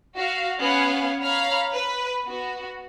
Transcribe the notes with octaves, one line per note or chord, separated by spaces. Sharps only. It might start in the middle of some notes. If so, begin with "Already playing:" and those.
F#4 F5
B3 C#4 F5 F#5 G#5
C#5 F5 A#5 B5 F6
B4
B3 F#4